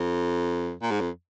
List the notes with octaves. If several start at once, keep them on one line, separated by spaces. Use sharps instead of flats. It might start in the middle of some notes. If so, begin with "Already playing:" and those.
Already playing: F2
A#2
G#2
F2